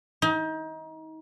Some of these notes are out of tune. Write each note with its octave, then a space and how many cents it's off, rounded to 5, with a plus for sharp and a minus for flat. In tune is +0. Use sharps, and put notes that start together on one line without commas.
D#4 +30